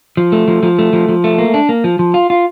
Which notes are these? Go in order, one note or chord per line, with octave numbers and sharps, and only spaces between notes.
F3
A3
F3
F3
A3
F3
F3
A3
A#3
D4
A#3
F3
F3
F4
F4